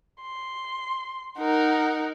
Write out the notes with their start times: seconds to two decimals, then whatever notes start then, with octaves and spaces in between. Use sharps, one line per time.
0.22 C6
1.39 D#4 A#4 F#5